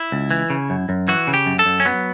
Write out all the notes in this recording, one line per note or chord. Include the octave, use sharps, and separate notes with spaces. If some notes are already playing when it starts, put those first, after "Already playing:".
Already playing: E4
C#2
E3
C#3
F#2
F#2
E3 F#4
C#3
G4
F#2
A4
F#2
C#4
F#3 B3